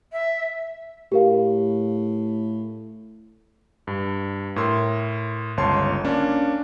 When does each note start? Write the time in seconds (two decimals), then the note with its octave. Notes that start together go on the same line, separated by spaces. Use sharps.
0.12 E5
1.12 A2 G4 A#4 F5
3.87 G2
4.56 A2 A#4 C6 E6
5.57 G1 C#2 C#5 A5 C6
6.04 A#3 C#4 D4